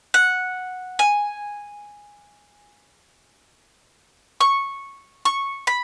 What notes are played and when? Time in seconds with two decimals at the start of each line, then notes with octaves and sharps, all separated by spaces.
0.14 F#5
0.99 G#5
4.41 C#6
5.25 C#6
5.67 B5